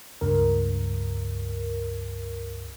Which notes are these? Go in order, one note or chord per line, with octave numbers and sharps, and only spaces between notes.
C#2 G2 A#4